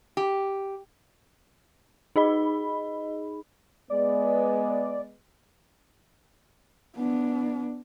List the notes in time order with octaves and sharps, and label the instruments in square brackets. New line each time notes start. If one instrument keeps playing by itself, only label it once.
[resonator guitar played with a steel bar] G4
[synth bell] D#4 G#4 D#5 B5
[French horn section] G#3 B3 [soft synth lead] D5
[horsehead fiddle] B3 D4